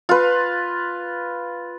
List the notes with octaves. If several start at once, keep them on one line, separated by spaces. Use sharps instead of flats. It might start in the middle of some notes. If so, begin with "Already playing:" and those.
F4 B4